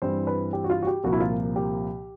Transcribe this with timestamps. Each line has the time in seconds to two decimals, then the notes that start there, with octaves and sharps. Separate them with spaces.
0.02 G2 E3 G3 C4 E4 C5
0.27 B4
0.53 G4
0.64 F#4
0.70 F4
0.82 F#4
0.87 G4
1.04 C2 A#2 F3 A#3 F#4
1.12 E4
1.20 F4
1.56 G4